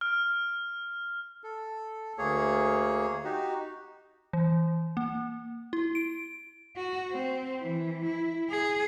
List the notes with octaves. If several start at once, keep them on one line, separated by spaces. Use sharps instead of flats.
F6
A4
D2 A#3 G#4 C#5
D#4 F#4 G4
E3
A#3
E4
D7
F#4
C4
E3
E4
G#4